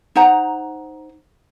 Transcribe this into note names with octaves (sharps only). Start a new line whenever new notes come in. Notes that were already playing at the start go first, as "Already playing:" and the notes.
D#4 C5 F#5 A#5